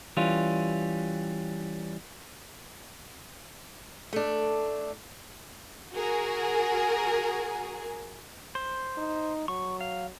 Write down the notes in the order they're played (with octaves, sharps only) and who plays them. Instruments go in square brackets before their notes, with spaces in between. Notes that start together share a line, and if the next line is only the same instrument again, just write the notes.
[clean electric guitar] E3 G3 C#4 F4
[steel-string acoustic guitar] A3 D4
[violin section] F#4 G#4 A#4
[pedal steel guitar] C5
[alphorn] D#4
[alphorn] F#3 [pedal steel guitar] C#6
[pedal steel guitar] F5